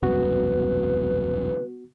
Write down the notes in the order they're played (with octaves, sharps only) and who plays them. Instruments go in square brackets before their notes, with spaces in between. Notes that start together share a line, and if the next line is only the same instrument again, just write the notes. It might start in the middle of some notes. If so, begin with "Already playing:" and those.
[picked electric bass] E1 C2 F#2 [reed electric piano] B3 F#4 [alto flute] B4